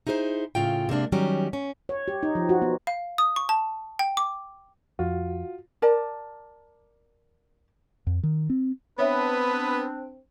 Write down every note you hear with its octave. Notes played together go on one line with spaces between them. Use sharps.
D#4 E4 G#4 A#4 C5
A2 C#3 F4 G5
C3 G#3 A#3 D4
D#3 F#3 G3 C#4 G4
C#4
C#5
G4
D#4
F3
F#4
B3
F5
D#6
C#6
A5
G5
D6
F2 F4 F#4
A#4 D5 A5
F2
D#3
C4
B3 C4 D4 B4 C#5 E5